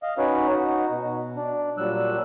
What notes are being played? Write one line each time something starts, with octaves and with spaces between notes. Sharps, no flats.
D#5 F5
C#4 D#4 F#4 B4 C#5
D#4 F#4
B2
D4
A#2 F#3 G3 E6 F#6